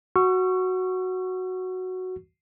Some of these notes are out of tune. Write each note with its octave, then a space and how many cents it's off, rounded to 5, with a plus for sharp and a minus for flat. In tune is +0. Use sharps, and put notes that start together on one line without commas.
F#4 +0 C#6 +0 E6 +45